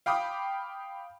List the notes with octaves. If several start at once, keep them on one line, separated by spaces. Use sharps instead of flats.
F5 G5 B5 D6 D#6